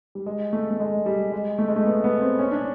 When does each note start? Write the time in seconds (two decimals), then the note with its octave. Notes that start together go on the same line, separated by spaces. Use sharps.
0.15 G3
0.26 G#3
0.53 A3
0.71 A3
0.80 G#3
1.06 G3
1.32 G#3
1.59 A3
1.68 G#3
1.76 A3
1.85 B3
2.04 B3
2.21 C4
2.39 C#4
2.51 D4